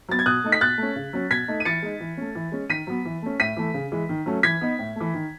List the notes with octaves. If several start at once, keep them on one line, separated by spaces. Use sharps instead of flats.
F#3 B3 A6
G#6
B2 D#6 F#6
A3 D#4
B6
B2 F#6 A6
A3 C#4
C#3
F#3 C#4
B2 G#6 B6
A3 D#4
D#7
E3 A6 C#7
G#3 D#4
E3
A3 C#4
E3
G#3 C#4
D#3 B6 D#7
F#3 B3
E3
A3 C#4
A2 B6 D#7
E3 A3
C#3
E3 G#3
D#3
F#3 A3 C#4
E3 G#6 B6
B3 D#4
A2
E3 A3
D#3